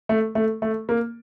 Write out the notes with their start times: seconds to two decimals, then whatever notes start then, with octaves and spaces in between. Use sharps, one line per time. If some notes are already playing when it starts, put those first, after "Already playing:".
0.09 A3
0.35 A3
0.62 A3
0.89 A#3